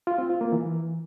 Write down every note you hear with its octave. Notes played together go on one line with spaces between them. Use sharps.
F4
C4
F4
A#3
E3